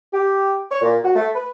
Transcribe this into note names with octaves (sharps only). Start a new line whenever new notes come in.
G4
C#5
A#2
F#4
A3
B4